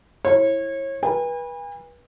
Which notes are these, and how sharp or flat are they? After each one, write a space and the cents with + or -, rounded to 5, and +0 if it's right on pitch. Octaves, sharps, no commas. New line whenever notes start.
E4 +0 C#5 -30
B4 -30 G#5 -45